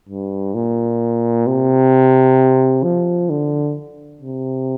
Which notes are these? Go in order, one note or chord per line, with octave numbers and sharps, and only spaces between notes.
G2
A#2
C3
F3
D3
C3